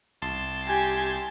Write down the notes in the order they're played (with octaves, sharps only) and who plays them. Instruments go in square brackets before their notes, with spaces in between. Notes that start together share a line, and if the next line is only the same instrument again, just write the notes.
[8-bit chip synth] C2 A5 C6
[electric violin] G4 G#5